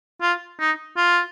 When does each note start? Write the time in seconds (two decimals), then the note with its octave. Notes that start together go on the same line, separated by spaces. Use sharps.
0.22 F4
0.60 D#4
0.97 F4